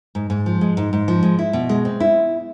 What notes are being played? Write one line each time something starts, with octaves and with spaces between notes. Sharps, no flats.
G#2
G#2
F3
G#3
G#2
G#2
F3
G#3
E4
B2
G#3
C4
E4